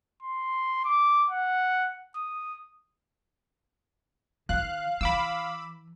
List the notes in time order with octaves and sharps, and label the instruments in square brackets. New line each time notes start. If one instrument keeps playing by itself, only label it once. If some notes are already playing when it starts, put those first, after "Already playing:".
[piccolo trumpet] C6
D6
F#5
D#6
[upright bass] D#3 [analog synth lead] F5 [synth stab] F#6
[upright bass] E3 [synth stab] B5 D6 E6